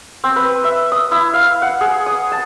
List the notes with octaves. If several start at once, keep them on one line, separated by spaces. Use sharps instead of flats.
C4
B4
E5
D#6
E4
F5
F#5
G#4
D#6
A5